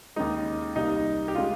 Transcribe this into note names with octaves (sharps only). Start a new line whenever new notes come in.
D#2 C#3 G#3 D#4
C2 C3 G3 A#3 D#4
G4
C#3 G#3 F4